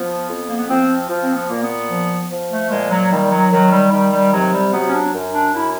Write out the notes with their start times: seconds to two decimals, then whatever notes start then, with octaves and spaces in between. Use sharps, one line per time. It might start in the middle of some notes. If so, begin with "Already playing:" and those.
Already playing: F3 B3
0.29 F2
0.46 A#3
0.57 B3
0.69 F3 C4
1.09 F3
1.23 C4
1.35 B3
1.49 A#2 A#3
1.62 B3
1.90 F3
2.31 F3
2.51 A3
2.70 A#2 G#3
2.91 F#3
3.11 D#3 G3
3.31 F#3
3.51 D#3 F#3
3.72 G3
3.92 D#3 G3
4.12 G3
4.32 C3 F#3
4.53 G3
4.73 F#3 B3
4.87 C#4
4.93 D4
5.14 F#2
5.33 D4
5.53 F#2 E4